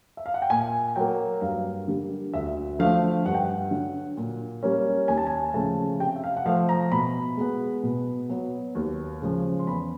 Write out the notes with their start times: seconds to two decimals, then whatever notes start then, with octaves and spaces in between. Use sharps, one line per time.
0.17 E5
0.26 F5
0.34 F#5
0.42 G5
0.50 A#2 G#5
0.96 F#3 A#3 G5
1.41 G2 F5
1.88 D3 G3 A#3
2.33 D2 E5
2.79 D3 F3 A3 F5
3.26 G2 F#5
3.34 G5
3.44 F#5
3.71 D3 F#3
4.17 A#2
4.63 G3 A#3 C#4
5.08 D#2 G#5
5.17 A5
5.27 G#5
5.54 C#3 F3 A3 A5
6.00 C3 G5
6.16 E5
6.24 F5
6.37 F#5
6.45 F3 A3 F5
6.69 A#5
6.92 B2 B5
7.37 G#3 B3
7.83 B2
8.29 F#3 B3
8.75 D#2
9.22 C#3 F3 G#3
9.59 C6
9.67 E2 B5